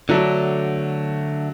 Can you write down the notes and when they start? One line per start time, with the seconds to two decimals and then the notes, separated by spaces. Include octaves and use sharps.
0.09 D3 F#3 A3 D4